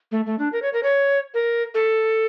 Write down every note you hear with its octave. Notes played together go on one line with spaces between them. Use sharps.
A3
A3
D4
A#4
C#5
A#4
C#5
A#4
A4